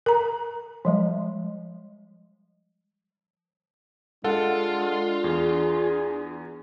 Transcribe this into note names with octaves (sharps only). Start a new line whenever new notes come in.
A#4 A#5
F3 G3 G#3
G#3 D4 F4 A4 F#5
E2 G#4